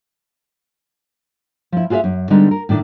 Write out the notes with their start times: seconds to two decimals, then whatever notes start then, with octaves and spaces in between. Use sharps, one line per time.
1.72 F3 E4
1.90 F4 F#4 G#4 D5 E5 F5
2.04 F#2
2.30 D3 G3 G#3 B3 D#4
2.51 A#4
2.69 A2 D#3 D4